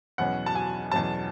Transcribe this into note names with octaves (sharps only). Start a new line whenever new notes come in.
E2 B2 F#3 C#4 F#5
A5
G#5
E2 B2 F#3 C#4 A5